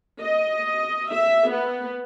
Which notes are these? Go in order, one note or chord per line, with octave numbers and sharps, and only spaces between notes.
D#5
E5
B3